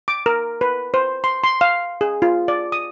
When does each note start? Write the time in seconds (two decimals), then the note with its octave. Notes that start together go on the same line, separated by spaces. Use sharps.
0.08 D6
0.26 A#4
0.61 B4
0.94 C5
1.24 C6
1.44 C6
1.61 F5
2.01 G#4
2.22 F4
2.48 D5
2.72 D#6